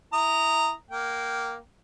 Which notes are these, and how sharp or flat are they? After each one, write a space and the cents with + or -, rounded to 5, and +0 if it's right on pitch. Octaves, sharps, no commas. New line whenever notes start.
E4 -10 A#5 -10 D#6 +0
A#3 +0 G5 -25